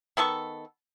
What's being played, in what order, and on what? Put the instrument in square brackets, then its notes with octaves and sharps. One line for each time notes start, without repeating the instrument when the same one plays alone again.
[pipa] D#3 B3 A4 C#6